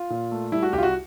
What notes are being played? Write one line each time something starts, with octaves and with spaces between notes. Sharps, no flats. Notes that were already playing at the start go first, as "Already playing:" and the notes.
Already playing: F4
A#2
A3
G3 E4
F#4
C2 G4
F4
F#4